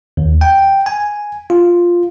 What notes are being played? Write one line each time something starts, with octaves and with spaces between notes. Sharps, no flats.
D#2
G5
G#5
F4